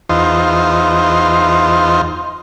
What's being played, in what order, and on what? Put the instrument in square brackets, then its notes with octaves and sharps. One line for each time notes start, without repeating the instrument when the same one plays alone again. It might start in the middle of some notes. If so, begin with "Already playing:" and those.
[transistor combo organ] E2 D#4 F4 C5